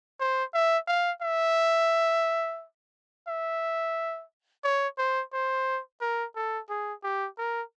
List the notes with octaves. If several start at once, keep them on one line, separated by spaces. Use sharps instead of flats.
C5
E5
F5
E5
E5
C#5
C5
C5
A#4
A4
G#4
G4
A#4